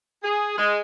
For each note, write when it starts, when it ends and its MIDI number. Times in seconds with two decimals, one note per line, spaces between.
0.23 0.54 68
0.58 0.80 56